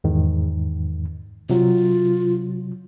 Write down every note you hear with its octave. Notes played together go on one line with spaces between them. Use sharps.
E2 G#2 D#3
C3 F#3 F4